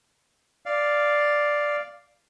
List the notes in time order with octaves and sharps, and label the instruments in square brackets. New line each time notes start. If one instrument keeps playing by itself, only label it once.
[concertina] D5 F5